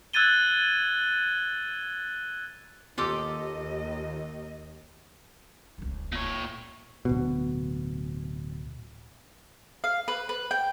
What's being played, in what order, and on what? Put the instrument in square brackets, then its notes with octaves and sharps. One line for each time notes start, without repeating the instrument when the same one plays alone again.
[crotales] E6 F#6 G#6 A6 D#7 G7
[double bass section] D#2 [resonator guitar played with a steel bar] F4 G4 A4 [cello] D#5
[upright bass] D#1 C#2
[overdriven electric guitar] A#2 C#5
[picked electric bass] D1 B2
[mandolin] F5
B4
B4
G5